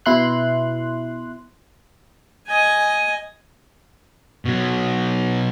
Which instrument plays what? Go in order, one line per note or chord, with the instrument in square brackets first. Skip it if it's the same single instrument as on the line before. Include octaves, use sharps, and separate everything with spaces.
[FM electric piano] B2 E4 C6 F#6
[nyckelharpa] D#5 G#5
[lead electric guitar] B2 F#3